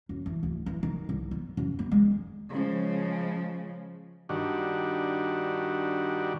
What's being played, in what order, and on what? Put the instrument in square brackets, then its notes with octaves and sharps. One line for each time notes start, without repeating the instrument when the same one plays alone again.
[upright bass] F#2
E3
D1
E3
D#3
C2
B3
F#2
B3
G#3
D#3
[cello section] C#3 F3 G#3
[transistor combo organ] G2 D#3 D4 F#4